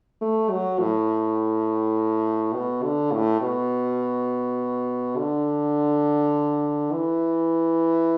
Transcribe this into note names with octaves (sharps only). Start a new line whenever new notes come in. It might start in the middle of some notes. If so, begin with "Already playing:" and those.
A3
F#3
A2
B2
D3
A2
B2
D3
E3